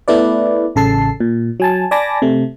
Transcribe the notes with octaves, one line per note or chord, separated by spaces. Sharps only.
A3 B3 E4 B4 D5
A1 C#3 A4 A5 C7
A#2
F#3 G#5 A5
D5 G#5 A5 B5 D6 A#6
C3 A3